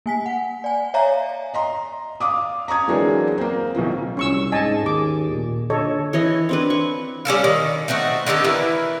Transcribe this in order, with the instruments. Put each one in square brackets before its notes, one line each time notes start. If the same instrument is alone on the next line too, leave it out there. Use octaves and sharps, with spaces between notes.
[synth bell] A#3 G#5 B6
F#5
D5 G#5
C#5 D5 E5 F5 G#5 A#5
[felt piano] D#5 A#5 C6
F5 D6 D#6
A#5 C#6 D#6 G#6
E3 F#3 G#3 A#3 C4 D4
A#3 C4
B1 B2 E3 F3
[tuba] C2 [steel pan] C#4 C#6 E6
[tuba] G#2 [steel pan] D#5 G#5 A5
[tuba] D#2 [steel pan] G#4 D6
[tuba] A#2
[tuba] D3 [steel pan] A4 C#5 D#5
[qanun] E3 C#5 D#5
C4 D4 B4
C#6
[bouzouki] G3 C#4 A4 F5
D#3
A3 C4 D#4 F#4
D3 D#3 G4 A4
E3 E4 A#4 B4